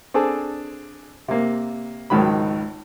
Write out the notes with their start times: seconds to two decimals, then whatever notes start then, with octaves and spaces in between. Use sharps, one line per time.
0.14 C4 D4 G#4 A4
1.28 C3 A#3
2.10 G#1 C#2 G#2 D#3 F#3 B5